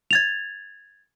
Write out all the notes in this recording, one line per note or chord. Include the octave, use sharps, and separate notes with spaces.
G#6 A6 F7